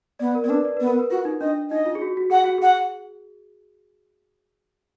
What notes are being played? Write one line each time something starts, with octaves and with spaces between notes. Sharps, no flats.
B3 D5
A#4
B3 D5
D4 B4
D5
B3 B4
A#4
B4
F4 F#4
D#4
D4 D#5
D#4 D#5
F4
G#4
F#4
F#4
G#4 F#5
F#4
G#4 F#5